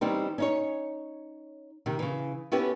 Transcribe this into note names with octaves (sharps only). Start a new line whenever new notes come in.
E3 G3 C4 C#4 D#4
C#4 D#4 C#5
C3 D#3
C#3 E3
B3 C#4 E4 G4 A4 B4